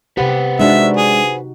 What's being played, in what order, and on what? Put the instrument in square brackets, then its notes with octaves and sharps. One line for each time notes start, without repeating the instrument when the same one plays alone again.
[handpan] C3 G4 [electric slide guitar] B4 C5 F#5
[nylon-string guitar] G#3 D4 [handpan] D#4 F#4 [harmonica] E5
[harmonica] G#4